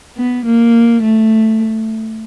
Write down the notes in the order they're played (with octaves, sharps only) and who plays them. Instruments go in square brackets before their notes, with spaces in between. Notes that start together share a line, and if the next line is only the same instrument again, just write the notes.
[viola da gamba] B3
A#3
A3